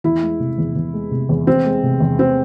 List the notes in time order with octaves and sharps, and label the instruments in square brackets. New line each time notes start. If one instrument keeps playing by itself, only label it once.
[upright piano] E2 [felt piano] E4
[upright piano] G#3
C3
E2
E2
G#3
C3
E2
[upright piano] E2 [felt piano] C4
[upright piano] G#3
C3
E2
[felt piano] C4